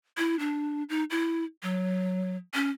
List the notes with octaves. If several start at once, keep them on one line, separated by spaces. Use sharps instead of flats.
E4
D4
D#4
E4
F#3
C#4